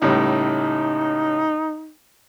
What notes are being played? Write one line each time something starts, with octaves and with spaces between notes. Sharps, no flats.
C#2 A2 G3 D#4